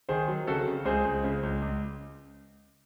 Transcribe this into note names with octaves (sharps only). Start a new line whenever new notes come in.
D#3 G#4 C5
F#3
C#3 F#4 A4
C#3
C#2 G#4 C5
C#2
C#3
C#2
C#2